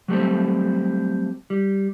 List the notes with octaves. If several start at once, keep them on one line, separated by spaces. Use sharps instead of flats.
F#3 G3 A3 C4
G3